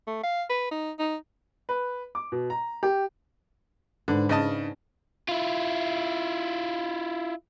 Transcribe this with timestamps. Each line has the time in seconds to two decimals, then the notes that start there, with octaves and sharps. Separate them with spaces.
0.07 A3
0.23 F5
0.50 B4
0.71 D#4
0.99 D#4
1.69 B4
2.15 D6
2.32 B2
2.50 A#5
2.83 G4
4.08 G#2 D3 D4 B4
4.29 C#3 D#5 A5
5.28 E4 F4